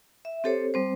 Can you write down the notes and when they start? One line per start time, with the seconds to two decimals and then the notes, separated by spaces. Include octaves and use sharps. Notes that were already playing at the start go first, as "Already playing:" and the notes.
0.25 E5
0.44 C4 G4 A4 C5 C#5
0.74 G3 C4 C5